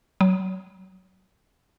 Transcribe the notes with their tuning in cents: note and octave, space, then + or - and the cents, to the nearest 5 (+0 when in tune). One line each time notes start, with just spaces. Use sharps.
F#3 +20